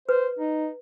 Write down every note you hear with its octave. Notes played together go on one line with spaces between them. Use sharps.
B4 C5
D#4